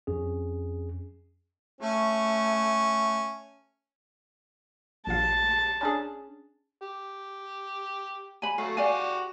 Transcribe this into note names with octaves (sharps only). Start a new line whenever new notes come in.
F2 C#4 G#4
A3 C#4
A#1 A#2 F5 A5
C#4 D4 G#4
G4
G#5 B5
F#3 A3 F5
F#4 G4 D5 F5 G#5